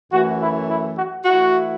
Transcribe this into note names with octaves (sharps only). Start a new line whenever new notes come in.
F#2 E3 A3 F#4
E4
E4
F#4
E3 A3 E4 F#4